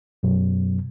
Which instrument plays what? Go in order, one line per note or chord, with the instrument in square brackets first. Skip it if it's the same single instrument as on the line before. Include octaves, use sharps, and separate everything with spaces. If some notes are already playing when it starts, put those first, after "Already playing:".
[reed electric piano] F#2 B2 F#3